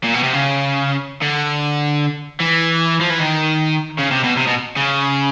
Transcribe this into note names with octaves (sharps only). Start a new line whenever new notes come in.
A#2
B2
C3
C#3
D3
E3
F3
E3
D#3
C#3
C3
B2
C3
B2
C#3